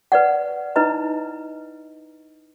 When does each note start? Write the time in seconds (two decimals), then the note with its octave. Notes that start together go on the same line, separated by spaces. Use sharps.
0.12 B4 D5 F#5
0.76 D#4 E4 B4 D#5 A#5